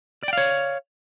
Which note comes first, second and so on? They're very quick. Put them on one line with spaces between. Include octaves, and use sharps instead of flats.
D5 G5 F5 C#5